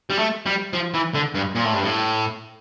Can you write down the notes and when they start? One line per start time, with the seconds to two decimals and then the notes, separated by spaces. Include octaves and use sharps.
0.10 G3
0.19 A3
0.46 G3
0.73 F3
0.94 E3
1.14 D3
1.35 G2
1.55 A#2
1.65 A2
1.74 G2
1.83 A2